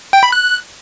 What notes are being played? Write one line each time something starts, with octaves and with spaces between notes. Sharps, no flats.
G5
B5
F#6